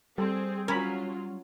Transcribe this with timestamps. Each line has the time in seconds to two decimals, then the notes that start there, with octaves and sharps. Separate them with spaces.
0.18 G3 C4 G#4 A4
0.68 F#3 C#4 F4 A#4 B5